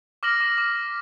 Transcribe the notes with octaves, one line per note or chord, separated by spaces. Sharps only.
D6 F6 A#6 F#7
D6 B6
D6